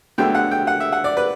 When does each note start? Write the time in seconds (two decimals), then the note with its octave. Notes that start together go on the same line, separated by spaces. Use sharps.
0.18 D2 D3 F#3 B3 G5
0.35 F#5
0.51 G5
0.67 F#5
0.80 E5
0.92 F#5
1.04 D5
1.17 B4